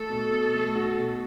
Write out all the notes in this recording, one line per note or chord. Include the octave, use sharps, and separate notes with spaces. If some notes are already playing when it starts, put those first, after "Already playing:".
Already playing: A3 A4
B2
B2
A3
F#4
B2